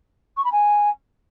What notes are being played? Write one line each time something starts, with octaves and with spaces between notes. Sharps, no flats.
C#6
B5
G#5